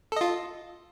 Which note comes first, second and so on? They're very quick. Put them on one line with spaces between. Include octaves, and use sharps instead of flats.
A4 D#5 F4